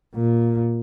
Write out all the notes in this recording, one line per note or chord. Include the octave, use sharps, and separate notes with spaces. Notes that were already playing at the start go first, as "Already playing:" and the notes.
A#2